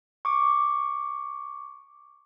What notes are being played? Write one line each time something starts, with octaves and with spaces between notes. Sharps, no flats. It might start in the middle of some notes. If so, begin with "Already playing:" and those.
C#6 D6